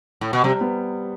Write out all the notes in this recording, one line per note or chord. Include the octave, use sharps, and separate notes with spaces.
A2
B2
C3 G3
B3